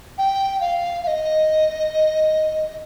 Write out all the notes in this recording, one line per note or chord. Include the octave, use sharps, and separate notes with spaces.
G5
F5
F5
D#5